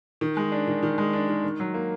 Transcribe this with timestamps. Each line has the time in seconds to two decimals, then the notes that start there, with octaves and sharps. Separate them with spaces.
0.21 D#3
0.37 G#3
0.52 D4
0.67 D#3
0.83 D#3
0.98 G#3
1.13 D4
1.29 D#3
1.44 D#3
1.60 F#3
1.74 A#3